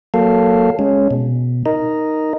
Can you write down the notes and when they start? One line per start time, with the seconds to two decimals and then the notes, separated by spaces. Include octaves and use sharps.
0.14 F#3 A#3 A4 F5
0.79 G#3 C#4
1.11 B2
1.66 D#4 A#4 D#5